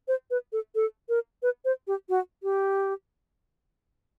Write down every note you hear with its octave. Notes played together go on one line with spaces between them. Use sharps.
C5
B4
A4
A4
A#4
B4
C5
G4
F#4
G4